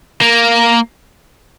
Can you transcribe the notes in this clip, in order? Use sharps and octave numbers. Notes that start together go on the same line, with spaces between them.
A#3